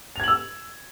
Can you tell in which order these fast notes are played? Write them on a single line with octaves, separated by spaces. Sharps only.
F7 G#6 F#7 E6